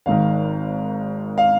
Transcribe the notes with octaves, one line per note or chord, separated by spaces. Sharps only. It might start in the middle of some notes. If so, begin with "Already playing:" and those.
G#1 G#2 D#3 F5
F5